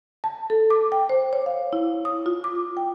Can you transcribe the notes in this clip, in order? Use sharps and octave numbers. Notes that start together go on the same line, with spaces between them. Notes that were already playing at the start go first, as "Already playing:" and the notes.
A5
A4
D6
G5
C5
C#5
F5
E4
D#6
F4
D6
G5